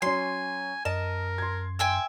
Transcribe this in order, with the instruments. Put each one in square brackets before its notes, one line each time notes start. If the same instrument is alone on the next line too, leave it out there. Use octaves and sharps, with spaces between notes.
[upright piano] F#3 C#4 [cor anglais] G#5 [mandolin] C6
[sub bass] F#2 [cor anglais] A#4 [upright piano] D#5 [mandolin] A5
[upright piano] C6 G#6
[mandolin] E5 G5 G#5